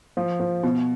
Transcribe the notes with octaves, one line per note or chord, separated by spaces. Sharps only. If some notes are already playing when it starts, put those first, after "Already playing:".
F3
F3
B2